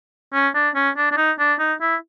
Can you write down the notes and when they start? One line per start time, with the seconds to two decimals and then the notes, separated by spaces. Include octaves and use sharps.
0.34 C#4
0.55 D4
0.75 C#4
0.97 D4
1.12 D4
1.17 D#4
1.39 D4
1.59 D#4
1.81 E4